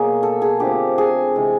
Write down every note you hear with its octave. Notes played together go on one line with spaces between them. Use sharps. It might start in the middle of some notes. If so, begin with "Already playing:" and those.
Already playing: B2 F#3 A#3 G#4
A4
G#4
D3 F3 A3 C4 G4
G#4
C3 E3 G#3